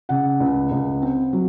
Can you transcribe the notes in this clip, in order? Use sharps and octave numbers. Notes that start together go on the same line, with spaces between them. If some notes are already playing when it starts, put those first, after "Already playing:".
C#3 F#5
C#2
C#2
C4
F#3